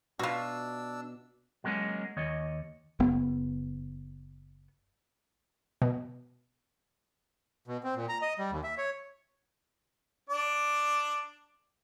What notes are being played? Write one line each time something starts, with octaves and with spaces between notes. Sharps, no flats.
B2 D4 F4 F#4 E5 E6
F#3 G#3 A#3 C4 C#4
D#2 C#5 D#5
F#1 B3
B2
B2
C4
A#2
A#5
D#5
G3
D#2
E5
C#5
D4 D5